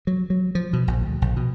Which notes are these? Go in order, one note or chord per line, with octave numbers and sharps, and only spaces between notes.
F#3
F#3
F3
B2
A#1
D2
A#1
B2